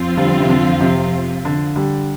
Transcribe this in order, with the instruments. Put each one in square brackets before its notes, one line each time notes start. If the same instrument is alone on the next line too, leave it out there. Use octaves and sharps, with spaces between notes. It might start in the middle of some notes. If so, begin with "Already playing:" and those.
Already playing: [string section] F2 F3 C4 F4
[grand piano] D3 G3
C3
D3
C3
D3
D3 G3